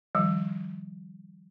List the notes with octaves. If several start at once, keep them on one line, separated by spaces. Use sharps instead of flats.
D#3 F3 G3